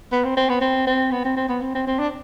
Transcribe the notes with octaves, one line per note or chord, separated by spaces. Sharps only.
B3
C4
C4
B3
C4
C4
B3
C4
C4
B3
C4
C4
C4
D4